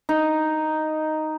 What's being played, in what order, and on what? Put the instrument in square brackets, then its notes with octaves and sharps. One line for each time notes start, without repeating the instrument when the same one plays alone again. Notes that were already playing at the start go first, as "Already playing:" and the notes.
[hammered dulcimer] D#4